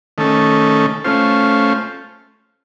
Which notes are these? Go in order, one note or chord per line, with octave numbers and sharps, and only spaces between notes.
D#3 A3 C#4 A4
A3 C#4 F4 C5